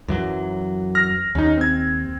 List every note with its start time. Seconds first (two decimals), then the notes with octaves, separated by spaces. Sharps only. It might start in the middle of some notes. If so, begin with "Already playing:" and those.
0.08 F#2 E3 F#3
0.95 F6 A#6
1.35 D#2 C#4 D#4
1.57 C4 G#6